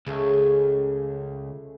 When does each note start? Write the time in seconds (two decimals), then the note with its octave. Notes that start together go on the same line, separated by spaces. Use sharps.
0.07 C#2 C#3 A3